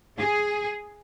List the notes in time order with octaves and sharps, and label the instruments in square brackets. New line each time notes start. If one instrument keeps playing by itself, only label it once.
[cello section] G#4